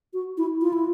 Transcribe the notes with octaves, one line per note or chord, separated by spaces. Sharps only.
F#4
E4
F4
E4